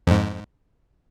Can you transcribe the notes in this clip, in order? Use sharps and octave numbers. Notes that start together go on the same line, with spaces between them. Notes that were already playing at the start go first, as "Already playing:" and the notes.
F2 G#2